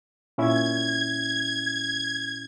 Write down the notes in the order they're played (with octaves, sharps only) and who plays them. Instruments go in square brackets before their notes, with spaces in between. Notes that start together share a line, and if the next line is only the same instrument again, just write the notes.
[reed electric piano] A#2 C#4 E4 [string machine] G#6